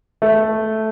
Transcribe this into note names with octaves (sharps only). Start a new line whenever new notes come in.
A3